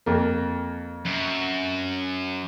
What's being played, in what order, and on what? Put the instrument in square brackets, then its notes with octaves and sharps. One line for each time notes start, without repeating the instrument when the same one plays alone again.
[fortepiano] F2 A#3
[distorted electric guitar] F#2